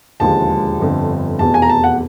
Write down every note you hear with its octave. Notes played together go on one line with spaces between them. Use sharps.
E1 D#2 D3 F3 G#3 A5
G1 F2 D3
F1 E2 B2 A5
G#5
A#5
A5
F#5